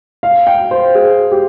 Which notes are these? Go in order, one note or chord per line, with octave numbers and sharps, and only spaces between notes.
F5
G5
C5
G#4
G4